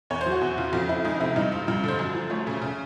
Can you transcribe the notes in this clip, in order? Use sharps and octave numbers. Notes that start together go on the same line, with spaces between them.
E2 C#5
C5
F#3
F#4
E2
C#3 F4
F2 F4
F3 E4
G#3 D#4
C3 E4
G2 D#4
F3 F4
G2 F4
D3 C5
F#2
F3
A3 C#5
C#3
C#3